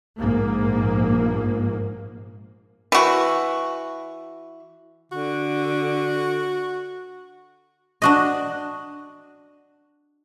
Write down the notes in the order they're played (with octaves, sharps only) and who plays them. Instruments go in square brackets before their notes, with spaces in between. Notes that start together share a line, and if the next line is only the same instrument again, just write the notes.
[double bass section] A#1 G#2 A#3
[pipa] E3 F#4
[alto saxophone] D3 [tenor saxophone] F#4
[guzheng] D4 F#4 D#5